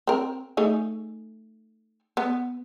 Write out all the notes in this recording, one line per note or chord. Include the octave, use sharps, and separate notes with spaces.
C4 A#4
A3 D#4 G#4
B3